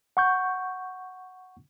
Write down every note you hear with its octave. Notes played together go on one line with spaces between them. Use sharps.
F#5 C#6 G6